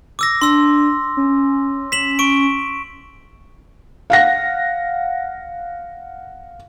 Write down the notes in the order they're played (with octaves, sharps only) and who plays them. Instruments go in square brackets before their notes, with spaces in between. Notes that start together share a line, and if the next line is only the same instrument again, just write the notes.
[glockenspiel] D6 E6 A#6
[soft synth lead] D4 [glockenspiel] C6 E6
[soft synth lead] C#4
[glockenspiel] B6 E7 F#7
C#6 D7
[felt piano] F5 F#5 A#6